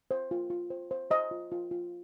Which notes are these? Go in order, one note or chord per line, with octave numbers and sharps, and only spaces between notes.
C5
F4
F4
C5
C5
C5 D#5
F4
F4
F4